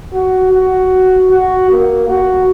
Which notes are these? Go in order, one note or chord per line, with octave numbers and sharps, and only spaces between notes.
F#4
F#4
F#4
A#3
F#4